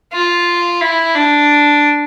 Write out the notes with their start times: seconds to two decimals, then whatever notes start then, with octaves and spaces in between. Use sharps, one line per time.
0.13 F4
0.81 E4
1.15 D4